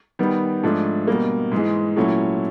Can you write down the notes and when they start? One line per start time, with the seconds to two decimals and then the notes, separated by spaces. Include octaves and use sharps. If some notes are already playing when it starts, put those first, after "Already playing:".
0.19 D#3 G3 B3
0.63 G#2 F3 A3 D4
1.08 B2 G3 A#3
1.52 G#2 E3 G#3
1.96 A#2 F#3 A3 C#4 E4